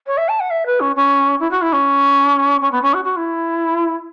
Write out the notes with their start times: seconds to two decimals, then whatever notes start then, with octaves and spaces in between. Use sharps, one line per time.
0.06 C#5
0.17 E5
0.28 A5
0.40 F#5
0.50 E5
0.66 B4
0.80 C#4
0.96 C#4
1.40 E4
1.51 F#4
1.61 E4
1.73 C#4
2.61 C#4
2.71 B3
2.82 C#4
2.94 F#4
3.05 F#4
3.16 E4